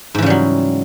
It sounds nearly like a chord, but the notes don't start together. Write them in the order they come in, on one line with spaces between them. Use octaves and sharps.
G#2 E3 C#3 G3 F#3